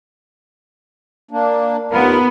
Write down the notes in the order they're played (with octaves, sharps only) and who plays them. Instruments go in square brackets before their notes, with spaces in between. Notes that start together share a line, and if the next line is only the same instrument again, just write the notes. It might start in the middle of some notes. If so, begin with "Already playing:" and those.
[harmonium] A#3 D4
[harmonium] D#2 F4 A#4 [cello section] B3